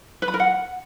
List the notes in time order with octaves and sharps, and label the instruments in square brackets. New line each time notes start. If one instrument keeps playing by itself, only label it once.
[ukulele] B4
B5
A#4
F#5